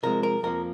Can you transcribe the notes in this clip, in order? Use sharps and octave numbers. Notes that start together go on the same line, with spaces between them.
C3 F3 G#3 A#4
A#4
F2 F3 A#3 A#4